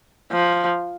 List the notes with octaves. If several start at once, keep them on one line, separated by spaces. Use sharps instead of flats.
F3